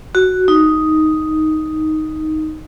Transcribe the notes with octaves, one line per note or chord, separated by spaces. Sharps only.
F#4
D#4